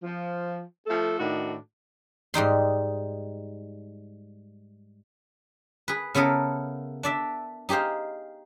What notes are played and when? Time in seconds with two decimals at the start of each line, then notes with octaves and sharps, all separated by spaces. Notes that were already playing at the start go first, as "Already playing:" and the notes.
0.03 F3
0.87 F3 A3 A4
1.19 A2 D#3 D4 D#4 F#4
2.34 G#2 G3 D#4 C6
5.88 G#4 B4
6.15 C#3 B3 E4 A4 A#4
7.03 D4 D5 E5
7.69 D#4 G4 G#4 C5 F5